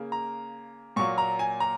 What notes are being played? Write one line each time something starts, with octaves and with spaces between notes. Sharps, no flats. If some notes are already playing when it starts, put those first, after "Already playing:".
Already playing: C#3 A#3
A#5
A#2 F#3 A#3 C#6
A#5
G#5
A#5